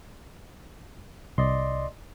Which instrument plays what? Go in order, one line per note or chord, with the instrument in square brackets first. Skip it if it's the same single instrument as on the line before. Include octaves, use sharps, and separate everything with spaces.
[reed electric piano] C2 [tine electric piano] D5 D#5 C6